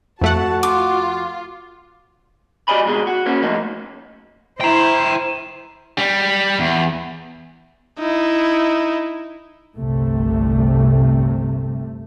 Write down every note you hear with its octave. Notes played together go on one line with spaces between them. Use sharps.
F2 A3 F#4 F#5 A5
F4 D6
F#4 G4 D5 D#5 G#5 B5
G#2 B2 G#3
F#4
A#3 C#4
F3 A3 A#3 D#4
E4 C5 G5 A#5
G3
E2
D#4 E4
G1 C2 C3 A3